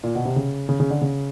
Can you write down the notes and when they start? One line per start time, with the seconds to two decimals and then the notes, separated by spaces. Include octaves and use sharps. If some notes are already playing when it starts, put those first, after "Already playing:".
0.04 A#2
0.15 B2
0.25 C3
0.36 C#3
0.69 C#3
0.80 C#3
0.90 D3
1.01 C#3